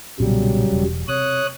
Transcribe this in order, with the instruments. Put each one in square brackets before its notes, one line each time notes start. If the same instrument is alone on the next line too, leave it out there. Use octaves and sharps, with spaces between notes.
[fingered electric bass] B1 A#2 B3 [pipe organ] C#3 F#3 G3
[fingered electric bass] E1
[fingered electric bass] C3 [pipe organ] C#5 D#6 F#6